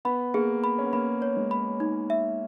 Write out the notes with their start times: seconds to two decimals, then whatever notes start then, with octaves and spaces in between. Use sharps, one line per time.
0.05 B3 B5
0.34 A#3 G#4
0.64 B5
0.79 C#4
0.86 B3
0.93 A#3 B5
1.22 C#5
1.37 G#3
1.51 B5
1.80 D#4
2.10 E5